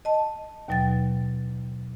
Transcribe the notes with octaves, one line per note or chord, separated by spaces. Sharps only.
D#5 A5
D#2 B2 F#3 G5 A6